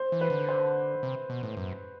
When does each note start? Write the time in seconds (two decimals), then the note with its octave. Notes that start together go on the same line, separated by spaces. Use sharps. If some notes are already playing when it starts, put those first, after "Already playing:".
Already playing: C5
0.12 E3
0.21 B4
0.30 D3
0.48 C5
1.03 C3
1.30 B2
1.43 A2
1.57 F#2